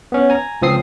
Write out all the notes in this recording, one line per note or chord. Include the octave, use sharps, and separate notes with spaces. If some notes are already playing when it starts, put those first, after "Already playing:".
B3 C#4
G#5 A#5
C#2 F3 C4 D#6 C7